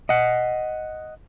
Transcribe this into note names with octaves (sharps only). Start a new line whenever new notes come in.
D#5 F#5